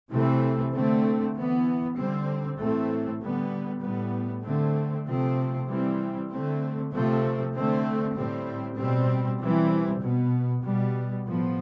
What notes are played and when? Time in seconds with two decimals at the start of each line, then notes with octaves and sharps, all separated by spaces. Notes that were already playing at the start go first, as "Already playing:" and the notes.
0.11 C3 E3 A3 C4
0.73 D3 A3 C4
1.35 E3 B3
1.97 D3 G3 C4
2.59 A2 E3 A3 C4
3.21 D3 G3 B3
3.82 A2 G3 B3
4.44 D3 A3 C4
5.06 C3 F3 A3 C4
5.69 E3 G3 C4
6.30 D3 A3 C4
6.92 C3 F3 A3 C4
7.54 D3 A3 C4
8.16 A2 G3 C4
8.77 B2 G3 C4
9.39 E3 G3 C4
10.01 B2 B3
10.63 B2 G3 B3
11.25 A2 F3 B3